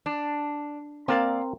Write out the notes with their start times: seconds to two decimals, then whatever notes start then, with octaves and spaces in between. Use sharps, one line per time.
0.06 D4
1.08 A#3 C4 A#4 D5 F5